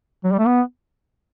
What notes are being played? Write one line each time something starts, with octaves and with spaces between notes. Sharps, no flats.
F#3
G3
A3
B3